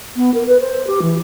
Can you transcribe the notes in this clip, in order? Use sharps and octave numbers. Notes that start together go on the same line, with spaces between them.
B3
A#4
B4
C5
G4
E3